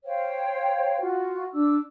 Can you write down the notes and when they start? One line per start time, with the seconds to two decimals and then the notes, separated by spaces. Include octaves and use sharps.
0.05 C5 C#5 F5 G5
1.01 F4 F#4
1.54 D4 D6 E6